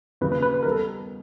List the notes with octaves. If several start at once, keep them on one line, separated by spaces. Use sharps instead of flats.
D#2 C#3 F3 B4
B4
B4
B4
D#3 G3 B3 A#4
A4